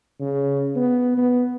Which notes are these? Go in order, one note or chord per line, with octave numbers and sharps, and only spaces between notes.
C#3
B3
B3